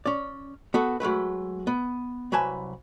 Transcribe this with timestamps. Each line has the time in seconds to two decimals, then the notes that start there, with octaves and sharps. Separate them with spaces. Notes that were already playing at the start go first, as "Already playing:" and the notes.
0.06 C#4 D5
0.74 B3 F#4 A4
1.00 F#3 G#3 A3 B4
1.67 B3
2.32 C2 F#3 B4 G#5 A5